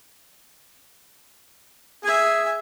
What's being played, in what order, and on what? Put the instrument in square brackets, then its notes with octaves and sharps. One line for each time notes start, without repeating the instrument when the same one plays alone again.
[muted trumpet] G#4 [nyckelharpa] E5 G#5